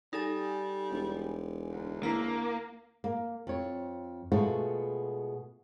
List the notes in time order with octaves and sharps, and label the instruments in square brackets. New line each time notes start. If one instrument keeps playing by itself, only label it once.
[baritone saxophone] G3 [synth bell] D#4 A4 G#5
[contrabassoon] E1
[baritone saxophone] D2
[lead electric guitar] A#3 [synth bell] E4 A#5
[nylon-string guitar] A#3
F2 C#5
B2 G#3 A3 B3 F4 F#4